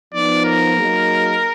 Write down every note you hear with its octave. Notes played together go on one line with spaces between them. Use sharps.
F3 B3 D#4 D5
A#4
F#3 A#3 D#4 G#4 D#5